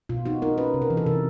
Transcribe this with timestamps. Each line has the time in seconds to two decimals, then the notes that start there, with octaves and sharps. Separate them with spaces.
0.09 B2 F4
0.26 D#4 F#4
0.42 D#4 A#4
0.58 C#4 B4
0.74 C3
0.82 A#4
0.90 E3
0.97 A4
1.06 C3 A#4